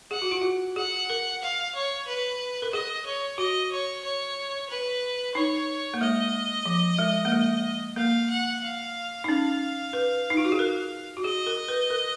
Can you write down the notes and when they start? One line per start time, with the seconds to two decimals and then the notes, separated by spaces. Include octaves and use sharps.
0.11 G#4 F#5
0.22 F#4
0.31 F4
0.42 F#4
0.76 G#4 F#5
1.10 A#4
1.42 F5
1.75 C#5
2.07 B4
2.62 A#4
2.73 G#4 D#5
3.06 C#5
3.38 F#4 D#5
3.72 C#5
4.04 C#5
4.70 B4
5.35 D#4 C#5
5.94 A#3
6.00 G#3 D#5
6.66 F3
6.99 G#3
7.25 A#3
7.32 G#3
7.97 A#3 F5
8.30 F#5
8.63 F5
9.24 D#4
9.28 C#4 F5
9.93 B4
10.30 D#4
10.37 F4
10.44 F#4
10.52 G#4
10.59 A#4
11.17 F#4
11.24 G#4 D#5
11.46 A#4
11.68 B4
11.90 A#4